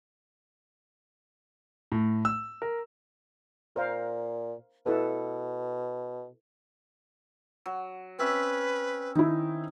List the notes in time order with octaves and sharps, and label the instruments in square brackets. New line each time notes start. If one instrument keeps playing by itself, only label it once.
[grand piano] A2
E6
A#4
[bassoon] A#2 [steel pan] A#4 C5 F5
[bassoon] B2 [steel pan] E4 A4 B4
[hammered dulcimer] F#3
[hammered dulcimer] C4 C#4 E5 [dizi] B4
[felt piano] D#3 E4 [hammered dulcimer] D#4